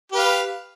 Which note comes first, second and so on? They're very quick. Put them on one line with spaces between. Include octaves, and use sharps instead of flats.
G4 B4 F5